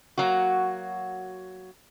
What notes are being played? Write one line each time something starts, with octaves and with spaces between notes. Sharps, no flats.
F#3 A#3 F#4